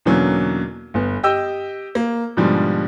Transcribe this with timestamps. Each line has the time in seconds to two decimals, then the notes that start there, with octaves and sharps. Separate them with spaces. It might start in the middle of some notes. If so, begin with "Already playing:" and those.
0.05 E2 B2 D3 F#3 A#3 C#4
0.94 G1 B3
1.23 G4 D#5 G5 E6 G6
1.95 A#3
2.37 G#2 B2 D3 F3 G3